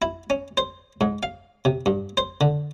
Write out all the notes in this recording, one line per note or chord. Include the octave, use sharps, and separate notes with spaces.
E4
C#4
C5
G#2
F5
C3
G2
C5
D3